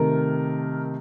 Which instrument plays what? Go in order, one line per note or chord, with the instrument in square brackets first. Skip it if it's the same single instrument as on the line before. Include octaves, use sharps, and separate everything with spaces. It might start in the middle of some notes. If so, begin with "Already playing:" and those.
Already playing: [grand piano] C3 D#3 A3 A#4